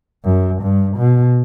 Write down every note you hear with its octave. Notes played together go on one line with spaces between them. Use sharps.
F#2
G2
B2